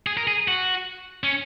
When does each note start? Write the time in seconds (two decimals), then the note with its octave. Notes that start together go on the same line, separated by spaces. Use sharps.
0.07 G#4
0.17 A#4
0.27 G#4
0.48 F#4
1.24 C#4